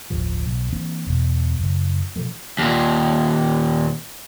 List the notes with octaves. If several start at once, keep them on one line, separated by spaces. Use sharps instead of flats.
G1 D2 A2 F3
B1
E3 A#3 C4 D4
E2 B2
F#2 C#3
B2 E3 F3 A3
D#2 A#2